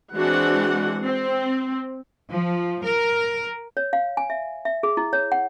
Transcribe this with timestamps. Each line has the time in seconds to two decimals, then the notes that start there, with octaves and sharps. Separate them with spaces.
0.16 E3 G#3 C4 D4 F#4 F#5
1.04 C4
2.31 F3
2.86 A#4
3.77 C#5
3.93 F5
4.17 G#5
4.30 E5
4.65 E5
4.83 G#4
4.97 E4
5.13 C#5
5.32 F#5